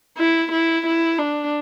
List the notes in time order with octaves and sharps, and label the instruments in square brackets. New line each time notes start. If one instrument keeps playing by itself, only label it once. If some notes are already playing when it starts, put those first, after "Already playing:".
[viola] E4
E4
E4
D4